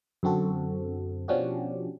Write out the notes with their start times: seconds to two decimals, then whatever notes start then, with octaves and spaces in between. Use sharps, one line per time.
0.23 F#2 D3 C4 F#4 A4
1.28 B2 F3 C#4 D4 F#4 G4